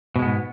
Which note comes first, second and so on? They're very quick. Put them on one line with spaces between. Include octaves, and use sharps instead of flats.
B2 G#3 B3 G#2